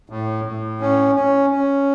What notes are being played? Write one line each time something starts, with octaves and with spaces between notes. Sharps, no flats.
A2
A2
C#4
C#4
C#4